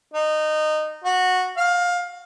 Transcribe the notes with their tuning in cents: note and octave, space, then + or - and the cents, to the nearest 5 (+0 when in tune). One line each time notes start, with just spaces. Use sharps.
D#4 -20
F#4 -10
F5 +20